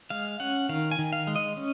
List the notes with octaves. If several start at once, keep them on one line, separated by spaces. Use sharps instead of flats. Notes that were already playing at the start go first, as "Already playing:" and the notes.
G#3 F5
C#4 F#5
D#3 F5
G#5
D#3
F5
G#3
D#5
C#4